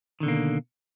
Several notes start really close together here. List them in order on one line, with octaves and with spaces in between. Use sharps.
D#3 D3 B2 A#3